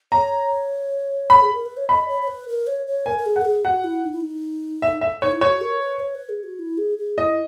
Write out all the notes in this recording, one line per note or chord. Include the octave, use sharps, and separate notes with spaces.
C#5 A#5
B5
G#4
A#4
B4
C#5
D#5 B5
C#5
C#5
B4
A#4
C#5
C#5
A#4 G#5
A#4
G#4
F#5
A#4
G#4
F#4 F#5
E4
D#4
E4
D#4
E5
E5
D#4 C#5
E4
F#4 C#5
A#4
B4
C#5
B4
G#4
F#4
E4
G#4
G#4
E4 D#5